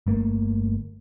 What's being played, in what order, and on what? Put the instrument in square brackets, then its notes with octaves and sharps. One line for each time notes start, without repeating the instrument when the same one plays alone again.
[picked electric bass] G1 A3 A#3